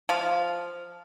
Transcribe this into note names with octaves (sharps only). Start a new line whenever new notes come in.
F3 F5